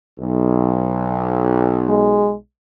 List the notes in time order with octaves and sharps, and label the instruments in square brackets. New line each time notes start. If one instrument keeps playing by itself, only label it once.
[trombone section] B1
[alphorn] G#3